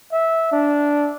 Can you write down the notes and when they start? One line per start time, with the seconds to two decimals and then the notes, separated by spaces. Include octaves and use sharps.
0.12 E5
0.52 D4